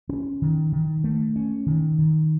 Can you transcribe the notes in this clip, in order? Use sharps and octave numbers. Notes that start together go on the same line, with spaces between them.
C#4
D#3
D#3
A3
C#4
D#3
D#3